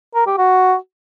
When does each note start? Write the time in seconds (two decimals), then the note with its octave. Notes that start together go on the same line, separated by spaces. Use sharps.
0.15 A#4
0.26 G4
0.38 F#4